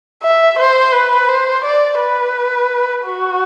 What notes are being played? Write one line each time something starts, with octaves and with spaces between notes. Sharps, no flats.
E5
C5
B4
C5
D5
B4
F#4